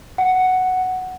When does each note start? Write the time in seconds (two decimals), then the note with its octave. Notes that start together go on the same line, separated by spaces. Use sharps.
0.18 F#5